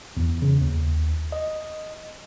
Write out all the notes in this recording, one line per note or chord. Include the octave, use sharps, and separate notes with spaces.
E2
C#3
D#2
D#5